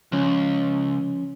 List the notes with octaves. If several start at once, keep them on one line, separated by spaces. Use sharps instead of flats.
C#2 F3 C#4